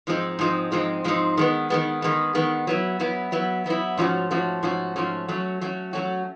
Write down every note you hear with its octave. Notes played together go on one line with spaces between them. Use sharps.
G#2 F3 G#3 C4 D#4
G#2 F3 G#3 C4 D#4
G#2 F3 G#3 C4 D#4
G#2 F3 G#3 C4 D#4
D#3 G#3 B3
D#3 G#3 B3
D#3 G#3 B3
D#3 G#3 B3
F#3 B3 E4
F#3 B3 E4
F#3 B3 E4
F#3 B3 E4
G#2 F3 A3 C#4 F#4
G#2 F3 A3 C#4 F#4
G#2 F3 A3 C#4 F#4
G#2 F3 A3 C#4 F#4
F#3 A3 C#4 F#4
F#3 A3 C#4 F#4
F#3 A3 C#4 F#4